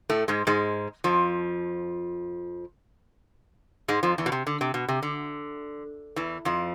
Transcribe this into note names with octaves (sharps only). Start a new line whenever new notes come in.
A2 A3
G#2 G#3
G#2 G#3
F2 F3
G#2 G#3
F2 F3
E2 E3
B2
C3
D3
C3
B2
C3
D3
E2 E3
F2 F3